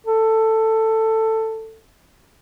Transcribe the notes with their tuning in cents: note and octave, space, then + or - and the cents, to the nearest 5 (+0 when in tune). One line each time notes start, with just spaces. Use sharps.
A4 +10